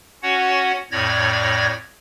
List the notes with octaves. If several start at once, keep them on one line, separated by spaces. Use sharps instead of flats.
C#4 F#4 C#5 F#5
F2 A2 C#5 D5 G#6 A#6